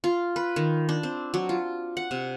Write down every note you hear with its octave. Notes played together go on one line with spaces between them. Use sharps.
F4
B4
D#3
D4
C4
F#3
F4
F#5
C3